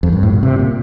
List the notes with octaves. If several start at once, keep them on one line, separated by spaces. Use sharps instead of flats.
F2
G2
A2
A#2
C3
A#2